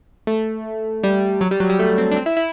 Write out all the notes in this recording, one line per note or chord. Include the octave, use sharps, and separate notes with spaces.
A3
G3
F#3
G3
F#3
G3
A3
C4
D4
C4
E4
E4